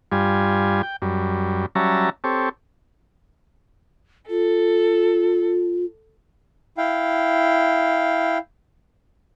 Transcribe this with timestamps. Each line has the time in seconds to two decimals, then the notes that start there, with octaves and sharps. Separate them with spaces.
0.12 G2 G3 F4 G#5
0.83 G5
1.02 F#2 G3
1.75 F#3 G3 C#4 E5 A5 A#5
2.24 C4 G4 A4 C#5
4.30 F4 A4
6.78 E4 F5 G5